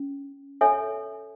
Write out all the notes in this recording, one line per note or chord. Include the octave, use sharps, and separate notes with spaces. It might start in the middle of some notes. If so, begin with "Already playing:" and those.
Already playing: C#4
A4 C#5 E5 G#5